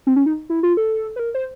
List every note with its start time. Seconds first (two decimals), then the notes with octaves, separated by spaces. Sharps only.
0.07 C4
0.16 C#4
0.26 D#4
0.50 E4
0.63 F4
0.77 A4
1.16 B4
1.20 A#4
1.35 C5